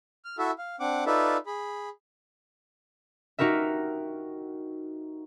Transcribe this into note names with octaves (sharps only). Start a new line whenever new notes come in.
F6
E4 F#4 A4 E5
F5
C4 D4 F#5 D6
D#4 F4 A4 B4 D5 E5
G#4 B5
D#4 F#4 G4 A#4 E5